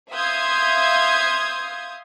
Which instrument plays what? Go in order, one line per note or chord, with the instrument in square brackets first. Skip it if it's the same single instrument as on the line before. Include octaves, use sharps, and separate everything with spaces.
[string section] E5 F5 C6 D#6 G6 G#6